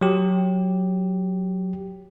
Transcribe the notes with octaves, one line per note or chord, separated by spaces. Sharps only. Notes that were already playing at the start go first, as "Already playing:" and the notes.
F#3 G4